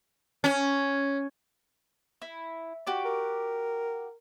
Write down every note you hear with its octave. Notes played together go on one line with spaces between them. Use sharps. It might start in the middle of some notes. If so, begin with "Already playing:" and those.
C#4
E4
F#4 G4 D5
A#4